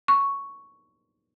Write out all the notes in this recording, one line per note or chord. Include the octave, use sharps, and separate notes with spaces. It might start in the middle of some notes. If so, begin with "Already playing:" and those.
C#6